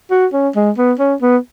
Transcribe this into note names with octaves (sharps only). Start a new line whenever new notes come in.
F#4
C#4
G#3
B3
C#4
B3